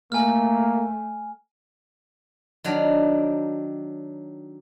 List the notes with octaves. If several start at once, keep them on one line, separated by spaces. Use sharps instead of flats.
A3 A#3 G#5 F6
D#3 F#3 D4